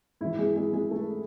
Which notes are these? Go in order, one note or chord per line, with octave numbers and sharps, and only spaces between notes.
G#2 E3 E4
G#3 G#4
G#3 G#4
G#3 G#4
A3 A4